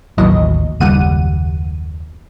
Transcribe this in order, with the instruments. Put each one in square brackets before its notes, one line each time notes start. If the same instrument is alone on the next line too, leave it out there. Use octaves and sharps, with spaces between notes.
[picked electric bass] A1 D#2 [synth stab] E3 F#3 D#5
[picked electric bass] F#1 D#2 [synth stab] G3 F#5 D#7